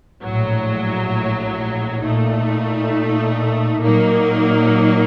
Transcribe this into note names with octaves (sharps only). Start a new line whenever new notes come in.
A#1 A2 F#3
A#2 A3 D#4
A#2 F#3 A#3 D#4